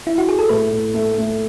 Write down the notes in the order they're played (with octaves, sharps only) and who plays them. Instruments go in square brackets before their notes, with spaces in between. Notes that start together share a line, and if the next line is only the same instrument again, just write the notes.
[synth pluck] E4
F#4
G#4
A4
[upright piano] A2 [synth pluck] B4
[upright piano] A2
A3
A3